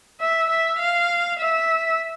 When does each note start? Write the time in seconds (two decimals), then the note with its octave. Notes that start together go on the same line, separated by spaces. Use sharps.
0.21 E5
0.50 E5
0.79 F5
1.39 E5